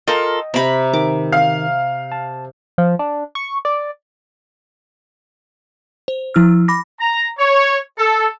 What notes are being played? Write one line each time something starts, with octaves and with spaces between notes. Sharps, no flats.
F4 A4 A#4 D#5 G5
C3 C4 A#5 B5
D#3 D6
F5 F6
A5
F3
D4
C#6
D5
C5
F3 E4 E6 F6
B5 D6 A#6
A#5
C#5
A4